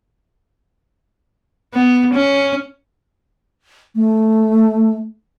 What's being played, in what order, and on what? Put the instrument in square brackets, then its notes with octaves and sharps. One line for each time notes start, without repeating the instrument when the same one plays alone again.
[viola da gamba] B3
C#4
[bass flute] A3